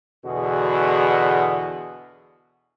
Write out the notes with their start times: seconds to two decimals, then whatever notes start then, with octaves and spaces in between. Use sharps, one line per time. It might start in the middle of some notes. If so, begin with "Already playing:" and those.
0.25 E2 B2 D3 F#4 G#4